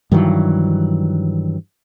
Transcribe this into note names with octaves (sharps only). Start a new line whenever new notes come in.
G2 D#3 E3 F#3